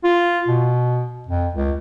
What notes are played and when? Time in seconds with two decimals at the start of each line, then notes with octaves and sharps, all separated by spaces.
0.04 F4
0.48 B2
1.28 F2
1.54 C#2